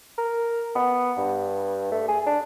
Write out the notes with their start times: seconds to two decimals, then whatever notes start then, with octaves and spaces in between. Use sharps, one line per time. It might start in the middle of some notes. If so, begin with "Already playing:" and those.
0.18 A#4
0.75 B3
1.17 G2
1.92 A3
2.08 G#4
2.27 D4